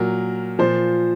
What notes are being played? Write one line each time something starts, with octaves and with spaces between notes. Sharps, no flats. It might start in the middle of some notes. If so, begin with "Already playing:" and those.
Already playing: A#2 F#3 A#4
A#2 F3 C5